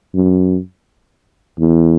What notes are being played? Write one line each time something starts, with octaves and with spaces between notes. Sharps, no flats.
F#2
E2